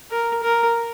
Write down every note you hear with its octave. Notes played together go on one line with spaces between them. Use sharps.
A#4
A#4